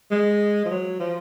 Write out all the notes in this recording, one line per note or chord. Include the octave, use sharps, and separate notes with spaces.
G#3
F3
F#3
F3